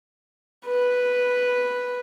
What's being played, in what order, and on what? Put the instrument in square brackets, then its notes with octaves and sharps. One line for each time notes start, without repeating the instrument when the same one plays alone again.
[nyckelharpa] B4